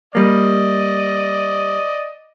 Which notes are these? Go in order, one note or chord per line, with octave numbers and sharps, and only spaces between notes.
G3 A#3 D5 D#5